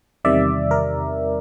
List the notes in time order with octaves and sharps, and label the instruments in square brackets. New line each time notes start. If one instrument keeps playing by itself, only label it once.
[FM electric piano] E2 C3 D#3 G3 D5 E5
A#4